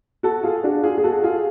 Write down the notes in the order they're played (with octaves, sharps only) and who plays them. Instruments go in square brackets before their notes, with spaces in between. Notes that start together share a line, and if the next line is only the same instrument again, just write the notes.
[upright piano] F#4 A4
F4 G#4
D4 F#4
F4 G#4
G#4
F#4 A4
F4 G#4